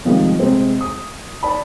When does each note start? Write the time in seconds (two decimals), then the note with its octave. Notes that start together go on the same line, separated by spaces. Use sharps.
0.05 C3 D#3 F3 G3 G#3
0.39 C3 G#3 C4
0.81 D#6
1.43 D5 A5 B5